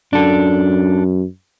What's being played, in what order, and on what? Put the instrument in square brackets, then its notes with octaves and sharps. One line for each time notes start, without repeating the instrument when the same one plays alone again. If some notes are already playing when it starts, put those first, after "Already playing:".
[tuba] F#2 [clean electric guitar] D4 A4